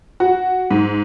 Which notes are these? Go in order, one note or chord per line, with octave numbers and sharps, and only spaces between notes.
F#4
G#2